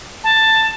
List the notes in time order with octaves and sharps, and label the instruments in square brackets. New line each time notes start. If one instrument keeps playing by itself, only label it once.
[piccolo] A5